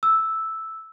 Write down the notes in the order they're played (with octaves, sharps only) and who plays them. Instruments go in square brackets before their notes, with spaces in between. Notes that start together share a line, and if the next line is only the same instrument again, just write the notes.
[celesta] E6